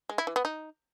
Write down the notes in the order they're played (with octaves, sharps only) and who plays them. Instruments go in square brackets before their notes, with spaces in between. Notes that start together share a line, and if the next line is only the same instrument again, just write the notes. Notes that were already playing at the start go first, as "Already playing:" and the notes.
[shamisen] G#3
E4
E3
B3
D#4